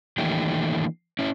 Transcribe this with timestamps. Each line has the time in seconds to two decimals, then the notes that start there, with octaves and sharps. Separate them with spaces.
0.18 D#3 E3 A3 A#3 D4 G4
1.19 C#4 E4